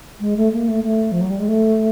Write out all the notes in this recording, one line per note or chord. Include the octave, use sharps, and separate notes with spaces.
G#3
A3
A#3
A3
A3
F3
F#3
G3
G#3
A3